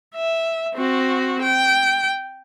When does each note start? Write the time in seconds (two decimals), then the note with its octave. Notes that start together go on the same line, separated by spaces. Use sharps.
0.15 E5
0.75 C4 F#4
1.42 G5